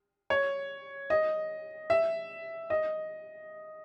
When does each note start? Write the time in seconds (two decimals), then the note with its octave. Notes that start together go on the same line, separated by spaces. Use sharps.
0.30 C#5
1.10 D#5
1.90 E5
2.70 D#5